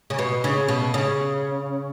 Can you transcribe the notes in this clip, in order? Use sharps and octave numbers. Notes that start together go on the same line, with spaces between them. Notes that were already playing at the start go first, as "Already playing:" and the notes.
C#3
B2
C#3
B2
C#3